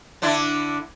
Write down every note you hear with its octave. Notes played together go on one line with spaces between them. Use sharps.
D3 D4 E4